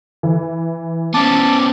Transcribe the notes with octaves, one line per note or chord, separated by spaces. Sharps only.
E3
B3 C#4 A5 D6